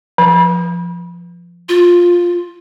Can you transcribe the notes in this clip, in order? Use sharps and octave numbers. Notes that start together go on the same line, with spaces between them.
F3
F4